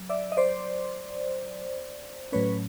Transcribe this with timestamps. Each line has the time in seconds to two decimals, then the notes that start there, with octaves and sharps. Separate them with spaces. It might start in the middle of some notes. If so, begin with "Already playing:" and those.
Already playing: F#3
0.09 D5 E5
0.32 D#5
0.37 C5 D5
2.32 A2 F#3 A3 C#4 B4 C#5